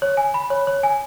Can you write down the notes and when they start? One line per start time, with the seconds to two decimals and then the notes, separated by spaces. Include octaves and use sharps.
0.02 C#5
0.17 G#5
0.34 B5
0.50 C#5
0.67 C#5
0.83 G#5